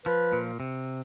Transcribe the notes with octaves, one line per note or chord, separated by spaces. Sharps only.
F3 B4
A#2
C3